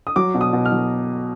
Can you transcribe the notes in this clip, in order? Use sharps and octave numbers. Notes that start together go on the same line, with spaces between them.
D#6
F#3 D6
B2
D#6
B2
F6
F#3